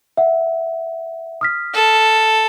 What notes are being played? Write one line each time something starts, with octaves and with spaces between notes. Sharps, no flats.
E5 F#5
D#6 F6 B6
A4